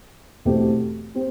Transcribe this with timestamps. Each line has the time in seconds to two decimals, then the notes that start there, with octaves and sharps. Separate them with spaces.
0.45 E2 B2 A3 C4 G4
1.15 C4 G4